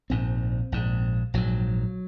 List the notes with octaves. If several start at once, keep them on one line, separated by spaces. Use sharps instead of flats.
A#1 G#2 C4
A#1 G#2
A#1 G#2 F#3